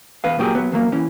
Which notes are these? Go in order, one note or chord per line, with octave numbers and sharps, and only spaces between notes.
E2 B4 F5
A#2 F#3 G4 G#4 A#4
F#3 B3
E2 F#3 A#3
E3 C#4